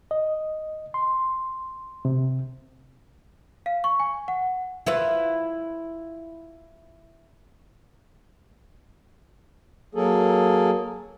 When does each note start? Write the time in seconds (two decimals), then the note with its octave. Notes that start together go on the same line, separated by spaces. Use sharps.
0.11 D#5
0.94 C6
2.05 C3
3.66 F5
3.84 C#6
4.00 G#5
4.28 F#5
4.86 E4 F4 B4
9.95 F#3 A#3 G#4 A4